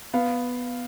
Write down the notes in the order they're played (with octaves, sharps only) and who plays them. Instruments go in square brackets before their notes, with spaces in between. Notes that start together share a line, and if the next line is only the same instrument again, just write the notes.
[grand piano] B3 F5